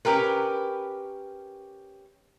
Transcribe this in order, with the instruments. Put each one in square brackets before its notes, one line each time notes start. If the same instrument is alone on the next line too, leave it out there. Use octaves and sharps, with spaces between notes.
[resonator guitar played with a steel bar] C#4 G4 A#4 B4